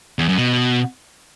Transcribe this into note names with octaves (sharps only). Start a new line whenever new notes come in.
E2
F#2
B2